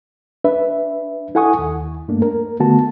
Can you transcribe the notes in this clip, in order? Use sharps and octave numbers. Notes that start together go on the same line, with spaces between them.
D4 B4 E5
E4 A4 F#5 G#5 C#6 D#6
D#2
G2 A3 A#3 D4
A#4
D3 A3 B3 F#4 A5